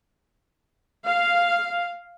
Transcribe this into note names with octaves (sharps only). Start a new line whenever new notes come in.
F5